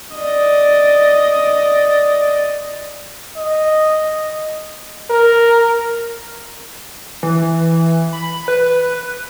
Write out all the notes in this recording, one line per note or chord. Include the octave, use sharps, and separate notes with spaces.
D5 D#5
D#5
A#4
E3
B5
B4